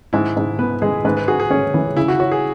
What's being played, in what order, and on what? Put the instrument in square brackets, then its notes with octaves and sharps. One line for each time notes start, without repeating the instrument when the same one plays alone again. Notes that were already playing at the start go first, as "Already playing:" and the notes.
[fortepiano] G#2 [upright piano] E4
[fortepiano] G#2
[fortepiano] B3 [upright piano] B4
[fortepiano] G#3 [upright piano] G#4
[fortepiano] G#2 [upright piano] B4
[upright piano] B4
[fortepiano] F#4 [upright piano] G#4
[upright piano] G#4
[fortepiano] C#4
E3
[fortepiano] C#3 [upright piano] E4
[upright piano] F#4
[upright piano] F#4 [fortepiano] C#5
[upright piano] G#4